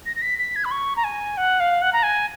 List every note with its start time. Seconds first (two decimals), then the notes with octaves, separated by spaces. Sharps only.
0.06 A#6
0.16 A#6
0.22 B6
0.38 B6
0.56 G#6
0.65 B5
0.71 C#6
0.96 A#5
1.04 G#5
1.37 F#5
1.60 F5
1.82 F#5
1.93 A#5
2.03 G#5